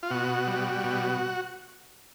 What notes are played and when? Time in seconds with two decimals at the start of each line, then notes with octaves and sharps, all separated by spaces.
0.03 F4
0.11 B2 F#4
0.47 G3
0.84 B2